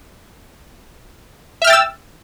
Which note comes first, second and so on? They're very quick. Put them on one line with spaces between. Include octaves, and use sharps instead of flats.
E5 F6 G5 A6 E6